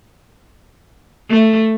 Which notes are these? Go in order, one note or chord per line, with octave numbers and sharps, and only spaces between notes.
A3